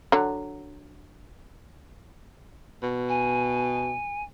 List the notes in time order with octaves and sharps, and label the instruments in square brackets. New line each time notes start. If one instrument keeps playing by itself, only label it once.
[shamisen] D3 F#3
[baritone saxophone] B2
[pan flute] G#5